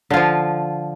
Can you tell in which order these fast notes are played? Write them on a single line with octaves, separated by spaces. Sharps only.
D3 F4 F3